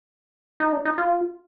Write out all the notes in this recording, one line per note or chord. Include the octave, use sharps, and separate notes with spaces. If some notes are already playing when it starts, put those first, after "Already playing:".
D#4
D4
D#4
F4